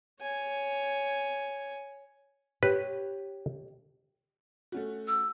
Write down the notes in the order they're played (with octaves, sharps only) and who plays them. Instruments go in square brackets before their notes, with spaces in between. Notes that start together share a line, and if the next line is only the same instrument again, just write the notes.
[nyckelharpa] C#5 G#5
[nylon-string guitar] G4 C#5 [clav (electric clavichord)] B4
[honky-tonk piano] A3 C#4 F#4
[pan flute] E6